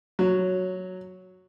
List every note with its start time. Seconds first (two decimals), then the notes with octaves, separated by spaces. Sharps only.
0.19 F#3